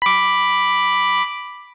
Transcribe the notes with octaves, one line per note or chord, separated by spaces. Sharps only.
B5 D6